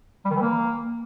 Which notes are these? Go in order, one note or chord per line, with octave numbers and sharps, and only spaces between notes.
G3
D#3
E3
A#3